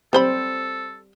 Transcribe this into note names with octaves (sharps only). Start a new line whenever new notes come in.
G3 C4 A4 C5 B5